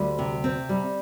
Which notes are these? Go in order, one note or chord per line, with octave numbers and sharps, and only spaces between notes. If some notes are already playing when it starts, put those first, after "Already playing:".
Already playing: D2 G3
C3
C4
G3